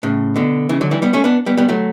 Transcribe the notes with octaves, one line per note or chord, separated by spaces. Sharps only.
A2 C#3
B2 D3
C#3 E3
D3 F#3
E3 G3
G3 B3
A3 C#4
B3 D4
G3 B3
G3 B3
F#3 A3